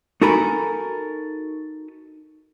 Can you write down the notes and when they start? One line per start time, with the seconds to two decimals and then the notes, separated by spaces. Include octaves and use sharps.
0.22 D#4 F#4 A4 A#4 G#5 B5